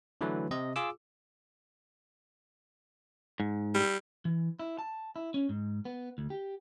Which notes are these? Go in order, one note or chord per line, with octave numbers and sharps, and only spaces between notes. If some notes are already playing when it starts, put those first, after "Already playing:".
D3 E3 F#3 A3 B4
C3 D#5
F4 G#4 D6 E6
G#2
G3
E3
E4
A5
E4
C#4
G#2
B3
D2
G4